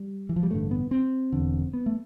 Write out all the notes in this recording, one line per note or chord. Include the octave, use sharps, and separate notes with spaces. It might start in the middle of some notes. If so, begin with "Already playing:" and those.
Already playing: G3
E3
F3
G3
A1 G2 D3 A3
B3
C4
E1 E2 D3
B3
A3